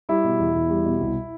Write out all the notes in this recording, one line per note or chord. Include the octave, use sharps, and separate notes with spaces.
G3 E4
B2
E2
E2
G3
B2
C2